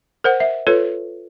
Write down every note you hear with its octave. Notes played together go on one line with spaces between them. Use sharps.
A#4 C5 F#5
E5
F4 A4 B4 C#5